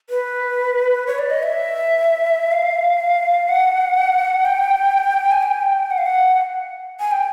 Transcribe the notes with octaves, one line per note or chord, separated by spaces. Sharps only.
B4
C#5
D5
D#5
E5
F5
F#5
G5
G#5
G5
F#5
F5
F#5
G#5
G5